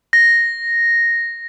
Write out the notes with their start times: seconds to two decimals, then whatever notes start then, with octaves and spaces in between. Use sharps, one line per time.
0.13 A#6